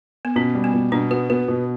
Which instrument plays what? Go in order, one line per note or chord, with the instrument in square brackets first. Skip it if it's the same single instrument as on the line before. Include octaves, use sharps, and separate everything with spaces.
[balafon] B3
[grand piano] B2 [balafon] C#4
[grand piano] G3
[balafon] B3
[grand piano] B2
[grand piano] B2 [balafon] D4
[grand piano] B3 [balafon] F#4
[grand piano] B3 [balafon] F#4
[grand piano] B2